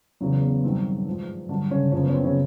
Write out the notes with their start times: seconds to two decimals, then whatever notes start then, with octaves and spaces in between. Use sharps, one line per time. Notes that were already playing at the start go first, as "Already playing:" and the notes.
0.21 E2 C#3 F#3
0.42 B3
0.64 G2 D#3 F#3 C4
1.06 G#2 F3
1.49 G2 D3 F#3 D4
1.71 C#3 C#4
1.92 F#2 C#3 F3 C#4
2.03 B3
2.09 C#4
2.14 C4
2.24 C#3 C#4